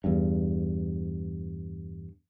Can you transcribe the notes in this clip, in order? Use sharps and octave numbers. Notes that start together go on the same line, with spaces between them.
E2 G2